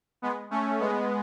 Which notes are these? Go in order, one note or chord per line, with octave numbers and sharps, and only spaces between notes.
G#3 B3
A3 C#4
G#3 B3